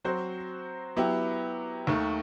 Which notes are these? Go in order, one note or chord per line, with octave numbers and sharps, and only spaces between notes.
F#3 C4 F#4 C5
F#3 B3 E4 G4
D#2 D#3 A3